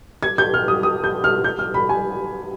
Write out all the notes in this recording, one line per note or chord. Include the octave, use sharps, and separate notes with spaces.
G#6
G6
F6
D#6
D#6
G6
F6
G6
F6
B5
G#5